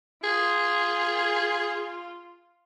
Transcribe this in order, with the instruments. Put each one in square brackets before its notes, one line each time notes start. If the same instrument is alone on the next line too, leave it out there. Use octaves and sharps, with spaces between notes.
[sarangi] F4 [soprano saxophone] G#4